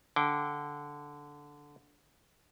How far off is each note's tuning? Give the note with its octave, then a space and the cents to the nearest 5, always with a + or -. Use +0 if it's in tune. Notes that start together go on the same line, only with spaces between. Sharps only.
D3 -10 G5 -15